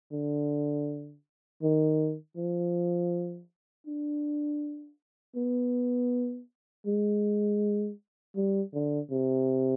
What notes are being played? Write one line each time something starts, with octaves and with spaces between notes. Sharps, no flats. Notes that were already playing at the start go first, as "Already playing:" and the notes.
D3
D#3
F3
D4
B3
G#3
G3
D3
C3